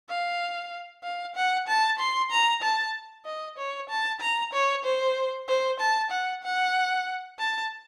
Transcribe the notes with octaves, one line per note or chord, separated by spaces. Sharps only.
F5
F5
F#5
A5
C6
A#5
A5
D#5
C#5
A5
A#5
C#5
C5
C5
A5
F#5
F#5
A5